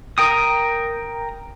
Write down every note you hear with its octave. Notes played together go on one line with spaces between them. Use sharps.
A#4 G5 D#6